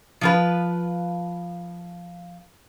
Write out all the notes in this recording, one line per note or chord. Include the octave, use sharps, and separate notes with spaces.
F3 F4 B4